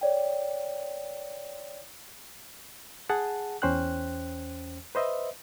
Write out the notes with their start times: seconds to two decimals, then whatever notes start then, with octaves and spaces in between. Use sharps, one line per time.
0.01 C#5 D5 G5
3.09 G#4 F#5 A5
3.62 E2 C#4 C5 G5 F#6
4.95 B4 C5 D#5 E5